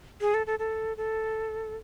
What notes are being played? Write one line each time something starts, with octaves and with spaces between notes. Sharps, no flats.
G#4
A4
A4
A4
A4